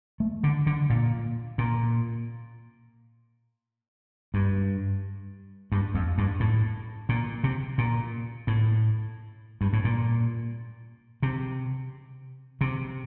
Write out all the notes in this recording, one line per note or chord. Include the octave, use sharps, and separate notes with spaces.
A3
D3
D3
A#2
A#2
G2
G2
F2
G2
A2
A#2
C3
A#2
A2
G2
A2
A#2
C3
C3